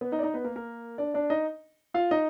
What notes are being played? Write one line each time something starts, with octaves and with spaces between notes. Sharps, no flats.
B3 B4
D#4 D#5
D5
D#4 D#5
B3 B4
A#3 A#4
A#3 A#4
D4 D5
D4 D5
D#4 D#5
F4 F5
D#4 D#5